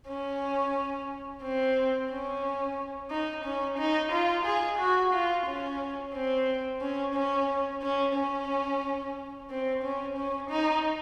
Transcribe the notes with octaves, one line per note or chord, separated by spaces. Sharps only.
C#4
C4
C#4
D#4
C#4
D#4
F4
G#4
F#4
F4
C#4
C4
C#4
C#4
C#4
C#4
C4
C#4
C#4
D#4